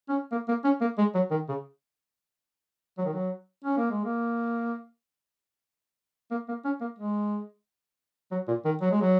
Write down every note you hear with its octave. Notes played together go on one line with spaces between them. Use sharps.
C#4
A#3
A#3
C#4
A#3
G#3
F#3
D#3
C#3
F#3
D#3
F#3
C#4
A#3
G#3
A#3
A#3
A#3
C#4
A#3
G#3
F#3
A#2
D#3
F#3
G#3
F#3